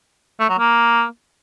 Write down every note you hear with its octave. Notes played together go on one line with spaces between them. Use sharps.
A3
F#3
A#3